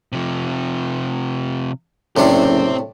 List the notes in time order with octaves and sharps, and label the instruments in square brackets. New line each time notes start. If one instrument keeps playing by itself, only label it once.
[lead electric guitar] C3 F3
[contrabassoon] F#1 [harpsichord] A2 C3 D4 [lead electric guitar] C4 C5